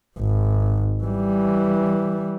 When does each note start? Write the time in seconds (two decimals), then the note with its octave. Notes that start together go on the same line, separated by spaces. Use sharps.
0.18 G#1
1.04 E3 G3